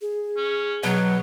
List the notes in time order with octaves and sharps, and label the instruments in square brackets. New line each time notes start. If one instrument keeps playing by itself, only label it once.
[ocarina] G#4
[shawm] C#4
[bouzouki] B2 [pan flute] F#3 [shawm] F#5